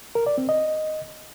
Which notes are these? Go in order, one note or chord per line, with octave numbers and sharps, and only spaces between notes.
A#4
D5
C4
D#5